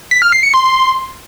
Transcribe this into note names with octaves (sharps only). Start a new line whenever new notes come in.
B6
F6
C7
C#7
C6